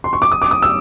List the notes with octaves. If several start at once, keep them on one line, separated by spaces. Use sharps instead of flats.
C6
C#6
D6
D#6
D6
D#6
E6